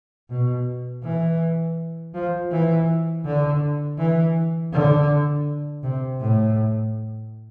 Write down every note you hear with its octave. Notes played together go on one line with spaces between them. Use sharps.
B2
E3
F3
E3
D3
E3
D3
C3
A2